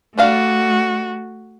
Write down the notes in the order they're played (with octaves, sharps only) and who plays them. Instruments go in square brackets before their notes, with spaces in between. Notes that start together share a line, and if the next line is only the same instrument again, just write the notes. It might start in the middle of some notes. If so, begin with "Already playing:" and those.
[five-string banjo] G3 D4 F5 [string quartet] A3 F#4